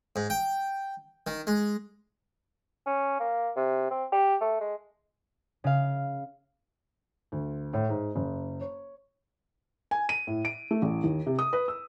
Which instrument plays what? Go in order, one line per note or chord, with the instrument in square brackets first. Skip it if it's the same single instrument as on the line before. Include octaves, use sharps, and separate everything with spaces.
[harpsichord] G#2
G5
D#3
G#3
[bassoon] C#4
A#3
C3
C4
G4
A3
G#3
[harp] C#3 F5
[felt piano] D2
A2
G#2
F#1
C#5
G#5
D#7
A2
D7
A3
A1
D#2
C3
D#6
B4
E6